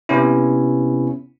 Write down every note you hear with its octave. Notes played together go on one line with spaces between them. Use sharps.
C3 B3 C#4 E4